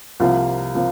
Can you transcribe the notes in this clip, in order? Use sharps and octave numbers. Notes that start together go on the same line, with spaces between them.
C2 C3 F3 A#3 F4
C3 F3 A#3 F4